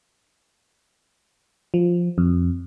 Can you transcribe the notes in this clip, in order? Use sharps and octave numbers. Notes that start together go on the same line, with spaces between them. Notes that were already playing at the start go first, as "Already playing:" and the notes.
F3
F2